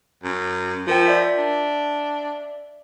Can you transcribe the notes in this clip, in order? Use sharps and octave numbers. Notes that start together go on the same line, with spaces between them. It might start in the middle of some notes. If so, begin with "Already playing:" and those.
F#2
F3 F4 A#4 G5
D5 E5 B6
D4